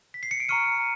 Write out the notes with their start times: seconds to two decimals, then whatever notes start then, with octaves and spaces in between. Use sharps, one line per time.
0.14 B6
0.23 C7
0.31 C#7
0.40 D7
0.49 A#5 C#6 F6 C#7 D#7